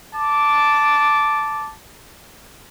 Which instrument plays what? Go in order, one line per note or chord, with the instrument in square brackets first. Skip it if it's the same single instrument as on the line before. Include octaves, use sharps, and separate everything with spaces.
[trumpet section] A5 D6